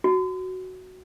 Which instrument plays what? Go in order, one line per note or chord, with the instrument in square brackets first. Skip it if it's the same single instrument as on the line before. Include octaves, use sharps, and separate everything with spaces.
[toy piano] F#4